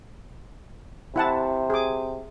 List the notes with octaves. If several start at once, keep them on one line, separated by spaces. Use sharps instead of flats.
C3 E4 F#5 A5
G#4 D6